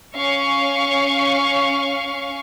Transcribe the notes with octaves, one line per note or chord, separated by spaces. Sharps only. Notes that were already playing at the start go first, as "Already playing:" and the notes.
C#4 F5 C#6